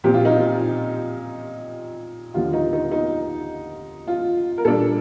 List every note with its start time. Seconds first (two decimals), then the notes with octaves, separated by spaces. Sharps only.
0.04 A#2 F3 C4 G4
0.14 F4
0.25 D#4
0.36 F4
2.34 D#2 D3 F3 F4
2.53 D#4
2.73 D#4
2.92 D#4
4.07 F4
4.58 A#4
4.65 A#2 G3 D4 A4